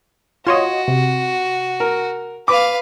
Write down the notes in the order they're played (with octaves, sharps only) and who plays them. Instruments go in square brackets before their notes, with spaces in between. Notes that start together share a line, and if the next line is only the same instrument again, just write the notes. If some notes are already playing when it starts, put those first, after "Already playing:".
[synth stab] F4 C#5 D#5 [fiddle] F#4 [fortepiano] C6
[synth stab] C3
[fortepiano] A#4
[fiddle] B4 F5 [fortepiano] D6